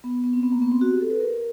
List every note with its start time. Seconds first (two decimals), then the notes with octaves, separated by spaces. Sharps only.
0.04 B3
0.24 B3
0.33 C4
0.43 B3
0.52 A#3
0.62 B3
0.72 C4
0.81 F#4
0.91 G4
1.01 A4
1.10 B4
1.20 A#4